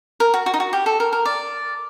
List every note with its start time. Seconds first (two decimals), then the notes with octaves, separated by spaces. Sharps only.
0.20 A#4
0.34 F#4
0.46 F#4
0.54 D#4
0.60 F#4
0.73 G4
0.86 A4
1.00 A#4
1.13 A#4
1.25 D5